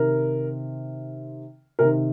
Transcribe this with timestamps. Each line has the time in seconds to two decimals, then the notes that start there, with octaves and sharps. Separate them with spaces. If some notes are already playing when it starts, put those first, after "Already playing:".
Already playing: C3 D#3 A#4
1.79 C3 D#3 A#4